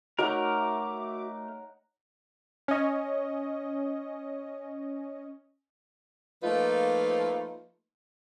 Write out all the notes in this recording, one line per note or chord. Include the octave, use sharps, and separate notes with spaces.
A3 D#4 F#4 A#4 C#5 E5 F#5 D6
C#4 D#5
F3 A3 A#3 D#4 F4 B4